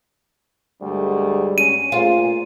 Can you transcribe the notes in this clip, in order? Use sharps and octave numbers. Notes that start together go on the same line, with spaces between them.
D2 G2 G3 G#3
C#4 D#7
A#2 A3 F4 G#4 C5